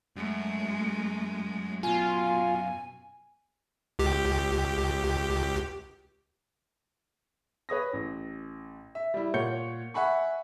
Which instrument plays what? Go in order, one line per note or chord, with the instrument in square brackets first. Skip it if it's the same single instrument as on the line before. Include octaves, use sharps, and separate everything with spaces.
[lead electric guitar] F#2 [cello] G#3 A3
[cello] B2 [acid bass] F4 [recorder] G#5
[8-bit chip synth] C#2 G4
[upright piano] B4 C#5 D#6 A#6
A1
E5
G3 E4
A#2 C#5 F#5 G6 C#7
E5 F#5 G#5 B5 C#6